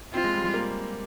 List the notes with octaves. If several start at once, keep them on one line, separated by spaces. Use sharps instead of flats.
C4 F4
G#3
G3
G3
A#3